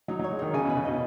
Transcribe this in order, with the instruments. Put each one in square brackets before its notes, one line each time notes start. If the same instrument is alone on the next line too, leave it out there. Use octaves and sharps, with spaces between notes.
[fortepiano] F#3 [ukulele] D#4
[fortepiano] F#3 [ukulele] C#5
[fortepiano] G#3
[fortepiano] D#3 [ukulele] D#4
[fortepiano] C#3 [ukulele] G#5
[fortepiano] B2 [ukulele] B4
[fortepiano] C#3
[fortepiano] B2 [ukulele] D#5